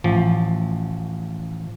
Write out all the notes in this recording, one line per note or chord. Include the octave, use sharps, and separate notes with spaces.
A1 F3